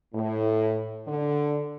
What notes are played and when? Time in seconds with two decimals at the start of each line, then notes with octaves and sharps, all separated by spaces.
0.14 A2
1.08 D3